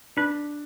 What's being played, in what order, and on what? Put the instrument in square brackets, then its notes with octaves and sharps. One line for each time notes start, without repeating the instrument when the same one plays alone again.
[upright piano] D4 [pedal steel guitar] B4